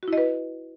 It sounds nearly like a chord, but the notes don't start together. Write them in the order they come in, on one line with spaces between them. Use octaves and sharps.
F#4 E4 D#5 B4